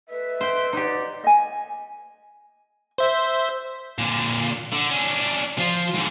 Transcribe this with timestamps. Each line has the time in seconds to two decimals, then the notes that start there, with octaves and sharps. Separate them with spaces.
0.09 A3 B4 D#5 E5
0.41 C5 G5
0.73 D#4 F#4 G4 C#5 D5
1.24 D#5 G#5
2.98 C5 E5
3.98 A#2 D3
4.73 D3
4.90 C#4 D4
5.58 F3 F4
5.95 G#2 D3